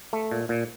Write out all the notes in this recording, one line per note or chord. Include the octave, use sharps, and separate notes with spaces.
A3
A#2
A#2